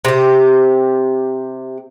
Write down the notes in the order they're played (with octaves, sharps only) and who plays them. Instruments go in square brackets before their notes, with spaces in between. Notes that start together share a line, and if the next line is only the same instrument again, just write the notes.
[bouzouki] C3 G4